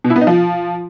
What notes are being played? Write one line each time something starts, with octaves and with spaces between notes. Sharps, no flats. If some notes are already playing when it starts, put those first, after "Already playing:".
B2
E4
B3
D#4
F3